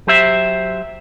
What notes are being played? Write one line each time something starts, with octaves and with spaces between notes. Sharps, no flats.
F#3 G4 C5 E5